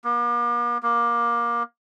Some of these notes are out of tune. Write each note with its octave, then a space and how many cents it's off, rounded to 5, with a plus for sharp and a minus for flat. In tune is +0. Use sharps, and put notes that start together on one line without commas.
A#3 +45
A#3 +20